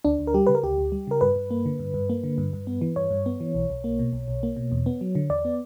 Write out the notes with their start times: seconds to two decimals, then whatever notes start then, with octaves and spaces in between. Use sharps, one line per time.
0.05 D2 D4
0.19 D2
0.27 A#4
0.34 G3 G4
0.47 C#3 B4
0.55 A#4
0.63 D2 G4
0.78 D2
0.92 G3
1.07 C#3 A#4
1.21 G2 B4
1.36 G2
1.51 A#3
1.66 D3
1.79 G2
1.94 G2
2.10 A#3
2.24 D3
2.38 G2
2.53 G2
2.67 B3
2.81 E3
2.96 G2 C#5
3.11 G2
3.26 B3
3.40 E3
3.55 B1
3.70 B1
3.84 A#3
3.99 B2
4.13 B1
4.28 B1
4.43 A#3
4.56 B2
4.71 E2
4.86 B3
5.01 F#3
5.15 D3
5.30 E2 D5
5.45 B3